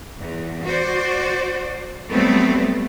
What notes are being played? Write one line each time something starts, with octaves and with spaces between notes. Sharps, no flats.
E2
F#4 C5 D5
F#3 G3 A3 B3 C4